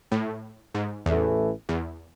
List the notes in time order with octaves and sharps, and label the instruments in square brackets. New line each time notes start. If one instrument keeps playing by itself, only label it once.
[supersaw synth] A2
G#2
[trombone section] A1 A2 E3 A3 [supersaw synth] E2
[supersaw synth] E2